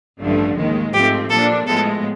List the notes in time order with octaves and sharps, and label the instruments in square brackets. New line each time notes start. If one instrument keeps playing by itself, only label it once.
[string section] A1 G2 D3 F3 A3
D#2 D#3 G#3
[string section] G#2 F3 A3 C4 [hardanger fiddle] G4
[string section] A#2 F3 A#3 D4 [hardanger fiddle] A4
[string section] A2 F3 G#3 B3 [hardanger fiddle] A4